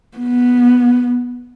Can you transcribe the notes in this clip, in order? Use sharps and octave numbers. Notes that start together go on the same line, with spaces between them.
B3